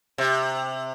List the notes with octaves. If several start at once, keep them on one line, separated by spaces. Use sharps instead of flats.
C3